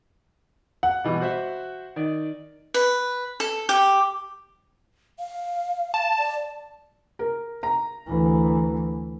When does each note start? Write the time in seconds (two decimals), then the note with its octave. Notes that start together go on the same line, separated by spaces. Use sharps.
0.83 F#5
1.04 B2 E3 G3
1.20 F#4 C5 E5
1.96 D#3 D5
2.74 B4
3.40 A4
3.69 G4
5.19 F5
5.94 A5
6.18 D5
7.19 A#4
7.63 A#5
8.06 D2 E3